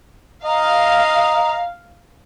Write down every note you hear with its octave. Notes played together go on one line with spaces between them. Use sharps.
D#5 F5 A#5